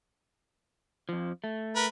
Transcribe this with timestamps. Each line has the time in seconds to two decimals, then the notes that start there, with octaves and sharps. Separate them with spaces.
1.09 F2 F3
1.44 A3
1.76 A#4 B4